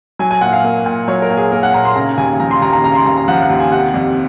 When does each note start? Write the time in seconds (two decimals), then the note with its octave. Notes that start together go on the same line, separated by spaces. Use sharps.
0.19 F#3 G#5
0.31 G#5
0.41 A#2 F#5
0.53 F5
0.64 A#3
0.86 A#2
1.08 F#3 C#5
1.22 A#4
1.30 A#2
1.37 G#4
1.51 A#3 A#4
1.63 F#5
1.74 A#2 A#5
1.85 C6
1.96 C#3 A#5
2.18 D#2 G#5
2.40 F3 A#5
2.51 C6
2.62 D#2 A#5
2.73 A#5
2.83 C#3 A#5
2.95 C6
3.06 D#2 A#5
3.17 A#5
3.28 F3 F#5
3.42 F#5
3.50 D#2
3.60 G#5
3.72 C3 F#5
3.94 F2